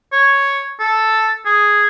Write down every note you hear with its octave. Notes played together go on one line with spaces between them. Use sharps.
C#5
A4
G#4